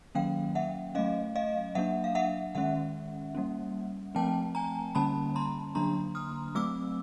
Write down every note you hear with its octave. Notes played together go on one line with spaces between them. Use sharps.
D#3 F#3 A#3 C#4 F5 G5
E5 F#5
F#3 A3 C#4 D#5 F5
D#5 F5
F#3 A#3 D4 E5 F#5
F5
E5 F#5
D#3 G#3 C#4 E5 F#5
G3 A#3 C#4
F3 A3 C4 G5 A5
G#5 A#5
D3 G3 A#3 C#4 A5 B5
A#5 C6
D3 F#3 A#3 D4 A#5 C6
D#6 F6
F#3 A3 C4 D6 E6